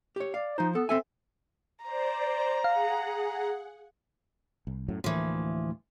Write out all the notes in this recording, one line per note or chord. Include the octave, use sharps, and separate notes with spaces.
G4 C#5
D5 F5
F3 D#4 C5
B3 A4
C4 A4 E5 G#5
C5 D5 A#5
G#4 F5 F#5
C2
F#2 A2 F#3
D2 A2 E3 F3 A#3